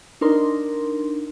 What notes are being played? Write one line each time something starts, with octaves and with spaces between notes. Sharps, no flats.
D4 D#4 A#4 C6